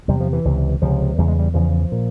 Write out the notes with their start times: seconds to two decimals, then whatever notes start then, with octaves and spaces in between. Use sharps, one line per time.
0.08 E2 C3 G3
0.20 F3
0.33 E3
0.45 C#2 C3
0.82 C#2 C3 F3
1.18 E2 C#3 G3
1.28 G#3
1.39 G3
1.54 E2 C#3 F3
1.92 A#2